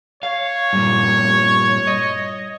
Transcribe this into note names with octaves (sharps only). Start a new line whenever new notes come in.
C#5 F5
G2 A#2
D#5